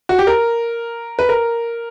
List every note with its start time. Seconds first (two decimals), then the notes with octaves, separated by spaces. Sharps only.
0.09 F#4
0.19 G4
0.27 A#4
1.19 B4
1.29 A#4